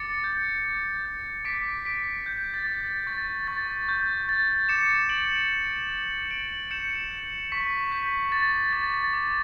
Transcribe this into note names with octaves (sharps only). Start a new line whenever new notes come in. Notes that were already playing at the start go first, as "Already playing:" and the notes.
Already playing: D6 A6 C#7
G6
D6
G6
D6 B6 D7
D6 B6 D7
F#6 G6
A6
D6
A6
C#6 A6
C#6 A6
C#6 G6
C#6 A6
D6 C#7 E7
D6 D7 F#7
F#6
D6
G6 D7 F#7
G6 C#7 E7
G6
C#6 B6
G6 B6
D6 A6
D6 A6
A6
D6